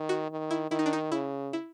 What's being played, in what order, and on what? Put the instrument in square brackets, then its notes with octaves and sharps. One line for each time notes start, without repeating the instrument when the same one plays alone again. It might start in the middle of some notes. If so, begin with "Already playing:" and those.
Already playing: [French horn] D#3
[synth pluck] F#4
[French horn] D#3
[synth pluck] E4
[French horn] D#3 [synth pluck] E4
[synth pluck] D#4
D4
D#4
[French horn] C#3 [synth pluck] E4
[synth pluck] E4